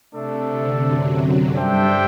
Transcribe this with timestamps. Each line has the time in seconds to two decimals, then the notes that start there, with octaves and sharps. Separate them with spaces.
0.13 C3 A3 D4 A4 E5
0.48 D3
0.83 F#2 F#3
1.54 G2 G3 D4 A4 C5 E5 G5